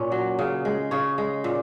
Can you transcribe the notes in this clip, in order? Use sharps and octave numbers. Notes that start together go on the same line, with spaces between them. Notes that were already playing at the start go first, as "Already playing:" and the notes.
Already playing: A#2 C#4 C#5
F#3
C#3
G#3
C#3 C#5
G#3
A#2